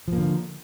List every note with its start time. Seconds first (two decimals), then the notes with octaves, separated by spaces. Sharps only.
0.08 F3
0.13 A#3
0.18 D3